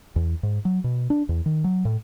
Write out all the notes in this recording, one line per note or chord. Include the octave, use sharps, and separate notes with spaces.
E2
G#2
F#3
B2
D4
E2
D#3
F#3
A2